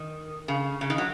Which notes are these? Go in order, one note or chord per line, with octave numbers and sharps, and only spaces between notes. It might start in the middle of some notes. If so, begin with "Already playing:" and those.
Already playing: D#3
C#3
C#3
D#3
F#3